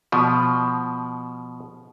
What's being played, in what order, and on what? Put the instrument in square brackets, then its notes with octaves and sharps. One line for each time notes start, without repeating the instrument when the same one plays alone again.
[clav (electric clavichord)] B2 F3